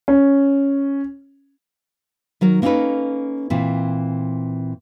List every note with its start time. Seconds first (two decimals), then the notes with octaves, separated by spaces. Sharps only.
0.08 C#4
2.41 D#3 F#3 A#4
2.62 A#3 B3 C#4 D#4 A4 B4
3.50 A#2 E3 C4